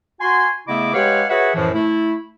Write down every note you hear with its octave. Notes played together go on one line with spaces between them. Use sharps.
F#4 G#5 C6
C#3 A3 B3 E4 D#5 D6
G#3 G4 B4 C#5 F5 F#5
F#4 G#4 B4 C#5 E5 F#5
F#2 A2 E3 F3
A3 E4